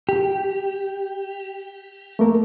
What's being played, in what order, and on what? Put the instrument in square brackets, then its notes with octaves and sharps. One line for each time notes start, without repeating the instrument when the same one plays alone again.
[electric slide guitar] G4
[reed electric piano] A3 A#3 A#4